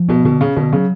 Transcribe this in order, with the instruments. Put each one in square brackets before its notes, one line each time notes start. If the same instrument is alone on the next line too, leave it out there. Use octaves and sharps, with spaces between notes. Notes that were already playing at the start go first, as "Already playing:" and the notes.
Already playing: [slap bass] F3
[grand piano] B2 [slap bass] B3
[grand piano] B2 [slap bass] D3
[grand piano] C#3 [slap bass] C#4
[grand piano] B2 [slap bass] D3
[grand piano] C#3 [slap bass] F#3